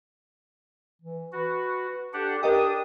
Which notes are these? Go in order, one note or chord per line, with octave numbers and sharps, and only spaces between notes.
E3
F#4 B4
D4 G4 A4 F#5
D4 G4 A#4 D#5 G5 D#6